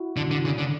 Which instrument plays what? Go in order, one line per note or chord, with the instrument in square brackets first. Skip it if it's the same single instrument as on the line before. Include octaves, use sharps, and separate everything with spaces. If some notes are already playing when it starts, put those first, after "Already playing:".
Already playing: [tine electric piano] E4 F#4
[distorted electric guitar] D3
D3
C#3
D3